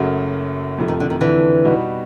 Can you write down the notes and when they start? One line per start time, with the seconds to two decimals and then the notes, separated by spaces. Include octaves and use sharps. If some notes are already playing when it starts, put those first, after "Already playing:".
Already playing: F#1 F#2 C#3 F#3 A3
0.78 F2 C3 F3 A3
0.88 D#3
1.00 D3
1.10 D#3
1.21 D3 E3
1.64 B2 G3 B3 D#4 F#4